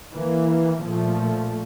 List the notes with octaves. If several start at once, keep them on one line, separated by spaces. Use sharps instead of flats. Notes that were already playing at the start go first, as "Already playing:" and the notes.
E3 A#3
A#2 F3 A3